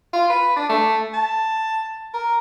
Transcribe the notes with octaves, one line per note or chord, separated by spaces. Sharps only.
F4
B4
D4
A3
A5
A#4